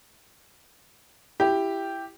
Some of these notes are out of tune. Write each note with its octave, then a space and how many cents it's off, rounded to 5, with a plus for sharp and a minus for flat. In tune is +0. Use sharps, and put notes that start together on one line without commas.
E4 +10 G4 +0